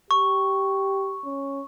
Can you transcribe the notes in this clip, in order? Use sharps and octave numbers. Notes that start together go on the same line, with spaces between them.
G4 C#6
C#4